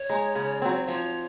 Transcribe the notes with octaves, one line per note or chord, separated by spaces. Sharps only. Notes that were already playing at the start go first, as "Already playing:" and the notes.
Already playing: C#5
G#3 D#4
C#3
F#3 C4
F3 C#5